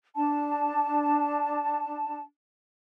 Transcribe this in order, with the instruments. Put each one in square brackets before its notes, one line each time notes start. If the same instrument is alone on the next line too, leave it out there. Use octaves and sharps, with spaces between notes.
[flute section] D4 A5